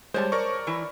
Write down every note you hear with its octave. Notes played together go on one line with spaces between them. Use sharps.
G3 G#3 C5 C#5 A5
A#4 D5 C#6
E3 E4